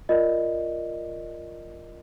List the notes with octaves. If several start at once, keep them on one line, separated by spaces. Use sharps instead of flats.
F4 A#4 D5 D#5